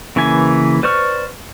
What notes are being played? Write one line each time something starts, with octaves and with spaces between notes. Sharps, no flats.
C#3 E3 A#3 B4 G#5
B4 C5 D5 C#6 F6